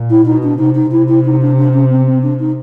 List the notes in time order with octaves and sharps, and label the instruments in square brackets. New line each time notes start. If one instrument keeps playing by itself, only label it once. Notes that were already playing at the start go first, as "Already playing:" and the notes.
Already playing: [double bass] A#2
[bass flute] E4
[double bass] B2 [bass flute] D#4
[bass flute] D4
[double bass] C3 [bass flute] D#4
[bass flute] D#4
[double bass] C3 [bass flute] E4
[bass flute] E4
D#4
D4
D4
C#4
C4
C4
D4
D#4